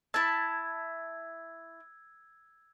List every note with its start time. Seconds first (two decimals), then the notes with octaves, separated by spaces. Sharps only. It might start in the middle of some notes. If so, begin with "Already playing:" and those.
0.14 E4 A5 E6 G#6